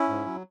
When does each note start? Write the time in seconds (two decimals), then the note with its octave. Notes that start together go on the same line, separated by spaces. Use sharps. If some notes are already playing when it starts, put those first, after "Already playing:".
Already playing: C#4 E4
0.09 G#2
0.26 F#3